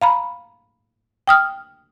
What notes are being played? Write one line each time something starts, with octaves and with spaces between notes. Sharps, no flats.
F5 A#5 B5
G5 D#6 F6